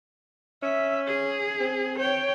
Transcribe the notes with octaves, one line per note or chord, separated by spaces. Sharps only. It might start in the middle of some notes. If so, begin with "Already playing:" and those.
C#4 E5
G#4
C4
C#5 G5